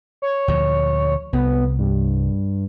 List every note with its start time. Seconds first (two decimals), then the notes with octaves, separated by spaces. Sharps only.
0.22 C#5
0.48 D2 A#2 F3
1.33 C2 B3
1.78 G2